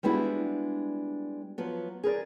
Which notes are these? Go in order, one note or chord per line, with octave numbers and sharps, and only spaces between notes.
G3 G#3 B3 D4 E4 F#4
F3 F#3 B3
G#4 A#4 B4 D5